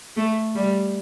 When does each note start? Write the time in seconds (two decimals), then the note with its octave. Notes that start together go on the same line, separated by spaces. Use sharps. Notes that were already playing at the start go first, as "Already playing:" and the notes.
0.17 A3
0.55 G3